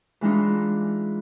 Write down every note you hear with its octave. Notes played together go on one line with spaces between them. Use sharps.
E3 G#3 D4 D#4 F4